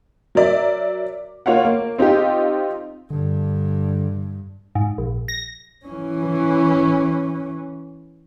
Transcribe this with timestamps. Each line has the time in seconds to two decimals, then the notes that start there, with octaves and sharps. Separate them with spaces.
0.35 F#3 A#4 D5 E5
1.46 A#3 F4 C#5 F5 F#5
1.65 A#3
1.99 C4 D#4 F4 G4
3.10 G2 D3
4.75 G#2
4.98 A#1
5.28 A#6
5.86 E3 C#4